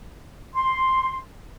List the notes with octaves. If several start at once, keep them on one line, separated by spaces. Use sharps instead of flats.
C6